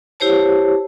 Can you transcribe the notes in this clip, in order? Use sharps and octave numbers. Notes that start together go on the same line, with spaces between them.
E4 G4 C5 C#5 A5